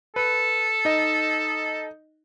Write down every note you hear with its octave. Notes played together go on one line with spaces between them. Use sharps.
A4 B4
D#4 D#5